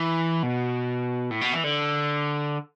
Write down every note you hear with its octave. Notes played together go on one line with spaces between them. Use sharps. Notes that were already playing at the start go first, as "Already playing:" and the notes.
Already playing: E3
B2
A2
B2
E3
D3